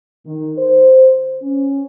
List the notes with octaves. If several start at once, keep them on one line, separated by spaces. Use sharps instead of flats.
D#3
C5
C#4